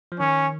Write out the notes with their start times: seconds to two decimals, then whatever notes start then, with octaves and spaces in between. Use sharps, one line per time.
0.12 F3
0.19 D#3 C#4